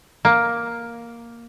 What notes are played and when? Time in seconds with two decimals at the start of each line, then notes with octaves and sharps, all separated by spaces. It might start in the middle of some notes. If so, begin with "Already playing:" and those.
0.25 A#3